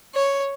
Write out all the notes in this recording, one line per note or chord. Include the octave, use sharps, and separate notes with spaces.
C#5